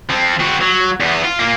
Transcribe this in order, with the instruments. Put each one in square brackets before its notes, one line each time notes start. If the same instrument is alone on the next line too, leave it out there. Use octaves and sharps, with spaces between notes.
[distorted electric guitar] F3 C4
C4 F#4
F#3
E2 B3
F4
A#3 F4